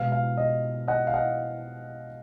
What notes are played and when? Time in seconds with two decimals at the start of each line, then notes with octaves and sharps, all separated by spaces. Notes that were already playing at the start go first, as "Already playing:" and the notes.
Already playing: B2 G#3 B3 F5
0.12 F5
0.37 D#5
0.88 D#5 F#5
1.07 F5
1.14 D#5 F#5